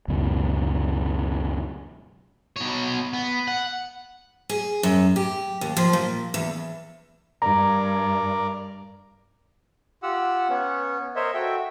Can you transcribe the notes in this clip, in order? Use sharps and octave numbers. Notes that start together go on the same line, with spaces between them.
C#2 F#2 B2
B2 C#5
B3
F#5
G#4
F#2
G4
D#2
F3
A#2
E2
G2 A#4 D5 A#5
F4 G4 F#5 E6
B3 C#4
A#4 C5 C#5 D#5 E5
F#4 A4 E5 G5